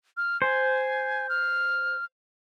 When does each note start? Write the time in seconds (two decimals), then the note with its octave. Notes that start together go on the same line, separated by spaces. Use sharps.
0.17 F6
0.42 C5 G#5
1.29 F6